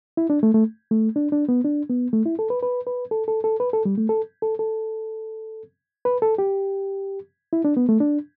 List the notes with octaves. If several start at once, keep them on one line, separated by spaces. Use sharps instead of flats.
E4
D4
A3
A3
A3
D4
D4
B3
D4
B3
A3
E4
A4
B4
B4
B4
A4
A4
A4
B4
A4
G3
A3
A4
A4
A4
B4
A4
G4
E4
D4
B3
A3
D4